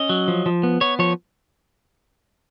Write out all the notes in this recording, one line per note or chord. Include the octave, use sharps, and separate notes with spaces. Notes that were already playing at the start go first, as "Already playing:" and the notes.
Already playing: C#4 D#5
F#3
F3
F3
B3
B3 C#5
F3 C#5